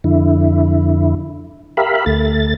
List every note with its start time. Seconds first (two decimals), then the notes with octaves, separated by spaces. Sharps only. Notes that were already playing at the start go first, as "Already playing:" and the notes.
0.04 F2 D3 E4
1.77 G4 A#4 E5 F5 B5
2.06 D2 A3 A6